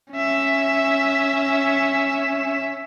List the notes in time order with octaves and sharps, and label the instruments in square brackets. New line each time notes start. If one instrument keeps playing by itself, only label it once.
[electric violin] C#4 E5